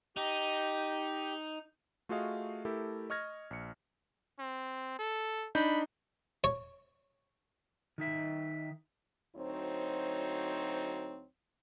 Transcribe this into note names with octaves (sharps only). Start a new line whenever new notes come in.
D#4 G4
A3 F4 F#4 G#4 D#5 F5
A3 E4 G4 A4 A#4
D#5 C#6 F6 G#6 A#6
A#1 C#7
C4
A4
D4 D#4 B5 G6
C#5
D#3 D#4 E5
D2 F#3 C4 D#4 C5 C#5